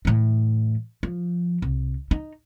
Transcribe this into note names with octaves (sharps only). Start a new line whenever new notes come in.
A2 E3
F3
C2
D#4